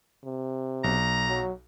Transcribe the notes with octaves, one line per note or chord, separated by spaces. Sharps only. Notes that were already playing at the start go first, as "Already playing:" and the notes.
C3
B1 A#5
F#3